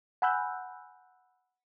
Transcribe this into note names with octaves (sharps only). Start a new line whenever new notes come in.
F#5 G#5 B5 E6 F#6 G6